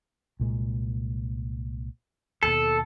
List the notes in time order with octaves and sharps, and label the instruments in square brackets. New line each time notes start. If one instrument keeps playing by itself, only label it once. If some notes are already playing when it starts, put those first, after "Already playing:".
[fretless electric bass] C2 A#2 G#3
[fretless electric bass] D#2 B2 [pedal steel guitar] A4